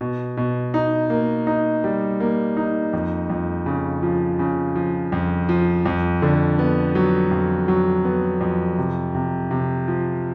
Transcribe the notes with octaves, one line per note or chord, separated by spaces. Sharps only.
B2
B2
D#4
A#3
D#4
G3
A#3
D#4
F2
F2
C#3
F3
C#3
F3
F2
F3
F2
D3
B3
F#3
F2
F#3
B3
F2
C3
C3
C3
F3